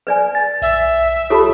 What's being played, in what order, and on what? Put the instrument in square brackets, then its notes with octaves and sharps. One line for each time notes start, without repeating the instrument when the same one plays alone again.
[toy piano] B4 D5 G#5
[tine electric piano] A6
[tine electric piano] B1 [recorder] E5
[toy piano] F4 G4 A4 [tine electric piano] C#5 A5 B5